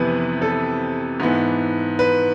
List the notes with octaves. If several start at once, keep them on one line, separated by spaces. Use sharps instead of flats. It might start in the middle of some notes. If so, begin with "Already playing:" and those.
Already playing: F2 C3 E3 B3 B4
A4
G#2 E3 B3
B4